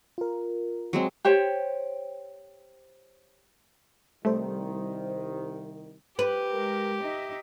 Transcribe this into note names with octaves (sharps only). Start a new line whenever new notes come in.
F4 A#4
F#3 G#3 C4
G4 C5 C#5 G5
C2 D#3 G3 A3 C5
G4 B4
G#3 A#4
D#4 D#5 E5